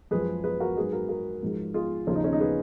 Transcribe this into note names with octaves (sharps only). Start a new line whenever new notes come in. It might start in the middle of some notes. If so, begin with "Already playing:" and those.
F#2 F3 G#3 G#4 B4
G#4 B4
F#4 A#4
G#2 F#3 G#4 B4
F#4 A#4
F#4 A#4
G#2 F3 G#3
F4 G#4
D#2 C#3 F3 C#4 F4
D#4
C#4
D#4
G#4 B4